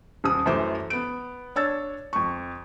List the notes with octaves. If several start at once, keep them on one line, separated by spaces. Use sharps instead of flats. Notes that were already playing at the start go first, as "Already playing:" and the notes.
D#1 D#6
F#2 E3 A3 C5 D6
B3 D7
D4 C#5 E6 A6
F2 C#6